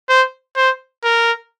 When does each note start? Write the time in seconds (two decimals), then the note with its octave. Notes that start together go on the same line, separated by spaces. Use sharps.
0.09 C5
0.56 C5
1.04 A#4